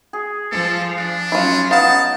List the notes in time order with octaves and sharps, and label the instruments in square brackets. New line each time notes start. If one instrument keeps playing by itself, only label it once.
[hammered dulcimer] G#4
[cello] F3 F4 [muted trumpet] A4
[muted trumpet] D4
[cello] F#3 C#4 [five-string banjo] E4 F4
[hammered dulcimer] B3 D#4 [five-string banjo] F5 [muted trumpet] A5